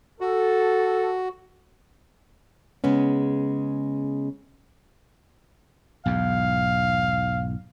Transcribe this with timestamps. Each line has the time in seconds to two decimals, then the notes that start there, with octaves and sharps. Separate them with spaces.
0.21 F#4 A4
2.84 C#3 G#3 B3 C#4
6.06 B1 E2 G#2 F5